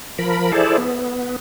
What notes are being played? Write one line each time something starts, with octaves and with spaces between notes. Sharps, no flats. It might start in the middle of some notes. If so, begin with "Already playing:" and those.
F3 A#4 B5
E4 G#4 A4 C5 D5
B3